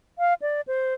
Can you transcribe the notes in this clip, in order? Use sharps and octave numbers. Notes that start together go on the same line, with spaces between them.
F5
D5
C5